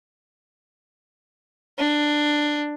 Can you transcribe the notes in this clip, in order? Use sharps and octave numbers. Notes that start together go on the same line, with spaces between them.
D4